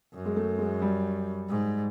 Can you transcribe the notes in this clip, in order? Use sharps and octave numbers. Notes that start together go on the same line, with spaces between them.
F#2
G#3
A3
G#3
G3
G#2